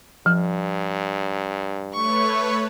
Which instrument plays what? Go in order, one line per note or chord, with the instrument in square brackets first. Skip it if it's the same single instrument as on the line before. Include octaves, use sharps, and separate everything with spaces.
[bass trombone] G2 [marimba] F3
[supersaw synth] A3 B4 C#5 [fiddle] C#6